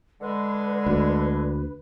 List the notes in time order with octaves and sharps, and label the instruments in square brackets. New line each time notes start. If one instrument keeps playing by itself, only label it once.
[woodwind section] D3 G#3 [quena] B4
[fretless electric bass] D2